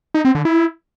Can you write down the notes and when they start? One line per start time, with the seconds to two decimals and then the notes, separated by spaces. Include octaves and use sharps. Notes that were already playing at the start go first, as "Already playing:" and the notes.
0.14 D#4
0.25 C4
0.35 D3
0.45 E4